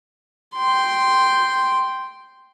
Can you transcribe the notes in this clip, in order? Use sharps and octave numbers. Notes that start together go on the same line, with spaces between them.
G5 C6